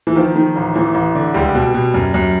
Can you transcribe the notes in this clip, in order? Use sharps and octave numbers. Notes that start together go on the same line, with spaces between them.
E3
D#3 F3
D#3
A1
A1 E3
A1
D3
C#2 G3
B2
B2
F#2
F#2